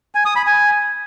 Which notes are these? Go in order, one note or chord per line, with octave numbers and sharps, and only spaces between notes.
G#5
D#6
B5
G#5